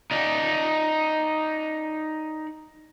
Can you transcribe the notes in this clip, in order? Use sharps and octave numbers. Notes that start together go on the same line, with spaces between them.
D#4 D5